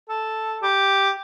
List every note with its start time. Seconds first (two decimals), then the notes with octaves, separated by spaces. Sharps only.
0.09 A4
0.62 G4